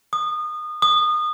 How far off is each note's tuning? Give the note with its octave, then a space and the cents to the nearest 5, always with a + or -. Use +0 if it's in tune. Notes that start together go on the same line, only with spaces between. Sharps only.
D#6 -25
D#6 -25